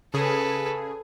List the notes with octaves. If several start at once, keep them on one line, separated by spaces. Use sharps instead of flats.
C#3 G#4 A4 B4